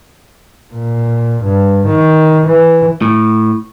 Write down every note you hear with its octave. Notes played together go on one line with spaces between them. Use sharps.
A#2
G2
D#3
E3
A2